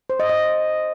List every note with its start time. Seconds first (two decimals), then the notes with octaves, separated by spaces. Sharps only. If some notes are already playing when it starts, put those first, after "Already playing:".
0.10 C5
0.20 D#5
0.30 D#5